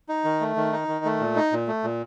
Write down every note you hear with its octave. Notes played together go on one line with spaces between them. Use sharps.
D#4
D#3
A3
D#3
D#4
D#3
A3
A#2
D#4
A#2
A3
A#2